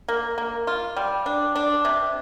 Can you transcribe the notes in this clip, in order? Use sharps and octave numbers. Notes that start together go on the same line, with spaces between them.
A#3
A#3
F4
G3
D4
D4
C3